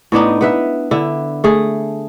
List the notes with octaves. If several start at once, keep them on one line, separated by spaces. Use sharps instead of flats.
A2 B3 D4 D#4
B3 B4 E5
D3 E4
A3 G#4